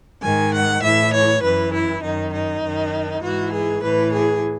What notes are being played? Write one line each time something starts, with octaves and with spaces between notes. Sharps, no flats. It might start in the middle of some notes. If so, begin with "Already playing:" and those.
G#2 D#3 G#5
F#5
A2 E3 E5
C#5
F#2 E3 B4
E4
F#2 D#3 D#4
D#4
F#2 D#3
G#2 E3 F#4
G#4
A2 E3 B4
G#4